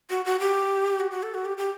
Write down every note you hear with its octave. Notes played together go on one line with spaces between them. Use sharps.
F#4
F#4
G4
F#4
F#4
A4
F#4
G4
G4